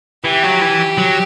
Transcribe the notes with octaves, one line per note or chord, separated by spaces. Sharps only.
E3 G4
F#3
E3
F#3